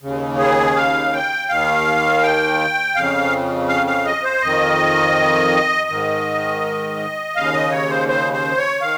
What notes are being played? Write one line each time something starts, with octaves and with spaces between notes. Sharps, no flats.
D#2 C#3
G#4
F5
G5
D#2 D#3 F5
G5
F2 C#3 F5
F5
F5
D#5
C5
F2 D#3 D#5
G#2 D#3
D#2 C#3 F5
D#5
C#5
C5
C5
C5
C#5
D#3 F5